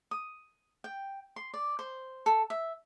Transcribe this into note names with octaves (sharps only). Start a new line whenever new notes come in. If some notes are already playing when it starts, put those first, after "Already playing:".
D#6
G5
C6
D5
C5
A4
E5